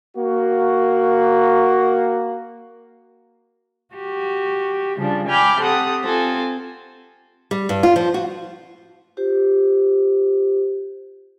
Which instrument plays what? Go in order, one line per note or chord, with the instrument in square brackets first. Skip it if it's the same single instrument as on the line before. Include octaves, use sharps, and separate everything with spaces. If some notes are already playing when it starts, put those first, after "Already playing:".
[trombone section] A#3 F#4
[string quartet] F#4 G4
C#3 F3 G3 D4
G5 G#5 B5 D6 F6 G6
C4 G4 A4 F#5 D#6
C4 F4 A4 G#5
[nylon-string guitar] G3
G2
F4
F3
F#4
[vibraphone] F4 G4 C5